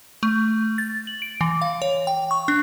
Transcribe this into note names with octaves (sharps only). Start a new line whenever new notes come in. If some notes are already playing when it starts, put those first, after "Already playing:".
A3
A6
F#7
D7
E3
F5
C#5
G5
C#6
D4